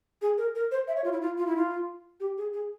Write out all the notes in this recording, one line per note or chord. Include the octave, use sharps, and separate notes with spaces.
G#4
A#4
A#4
C5
E5
C#5
F4
E4
F4
F4
E4
F4
G4
G#4
G#4